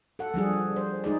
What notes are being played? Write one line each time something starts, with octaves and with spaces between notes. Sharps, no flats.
A4 F#5
F3 G3 D4 G#4
C5
G#3 D#4 G#4 D5